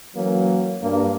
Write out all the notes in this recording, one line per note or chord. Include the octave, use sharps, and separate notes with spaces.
E3 F#3 A#3 C#4
G2 A#3